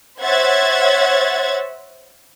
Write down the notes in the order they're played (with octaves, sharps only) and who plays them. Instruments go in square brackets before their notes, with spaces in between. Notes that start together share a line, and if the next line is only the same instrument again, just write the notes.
[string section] C5 C#5 E5 F#5 G#6 A6